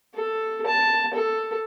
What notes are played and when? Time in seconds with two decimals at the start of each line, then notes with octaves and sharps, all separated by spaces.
0.15 A4
0.67 A5
1.14 A4